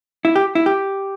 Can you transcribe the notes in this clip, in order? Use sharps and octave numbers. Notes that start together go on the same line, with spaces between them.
E4
G4
E4
G4